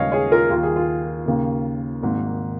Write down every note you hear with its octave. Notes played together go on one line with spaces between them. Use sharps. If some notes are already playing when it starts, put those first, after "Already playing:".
Already playing: D#2 C#3 G#3 C#4 C#5 D#5 F5
G#4 C#5
F4 A#4
D#2 D#3 A#3 D#4 F4
G#4
F4
D#2 C#3 A#3
G#1 G#2 D#3 A#3